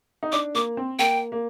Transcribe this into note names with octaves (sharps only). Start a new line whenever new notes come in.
D#4
D4 D6
A#3 D6
C4
A#3 G5
A#3